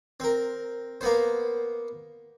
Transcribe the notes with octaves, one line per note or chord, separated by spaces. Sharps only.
C4 A#4
A#3 B3 C5